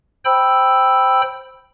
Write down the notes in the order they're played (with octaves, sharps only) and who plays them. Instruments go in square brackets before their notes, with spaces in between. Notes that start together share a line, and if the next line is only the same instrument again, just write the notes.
[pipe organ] C5 G5 B5 E6